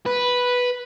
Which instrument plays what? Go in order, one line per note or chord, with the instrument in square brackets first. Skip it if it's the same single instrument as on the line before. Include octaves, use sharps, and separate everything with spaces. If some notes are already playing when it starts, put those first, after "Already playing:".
[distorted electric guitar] B4